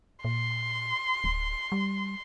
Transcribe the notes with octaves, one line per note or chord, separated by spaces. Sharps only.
A#2 C6
D1
G3